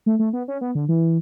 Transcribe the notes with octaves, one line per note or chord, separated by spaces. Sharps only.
A3
A3
B3
C#4
B3
D3
E3